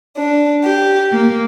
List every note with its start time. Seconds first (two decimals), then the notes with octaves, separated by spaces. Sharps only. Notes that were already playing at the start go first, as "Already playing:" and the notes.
0.17 D4
0.64 G4
1.11 A#3